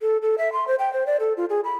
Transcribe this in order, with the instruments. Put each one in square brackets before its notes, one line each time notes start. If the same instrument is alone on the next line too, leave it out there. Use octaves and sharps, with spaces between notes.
[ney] A4
A4
E5
C6
C5
G5
C5
D5
A4
F4
G#4
B5